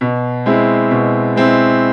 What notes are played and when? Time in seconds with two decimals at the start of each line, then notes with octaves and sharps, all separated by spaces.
0.01 B2
0.46 G#3 C4 E4
0.91 B2
1.36 G#3 C4 E4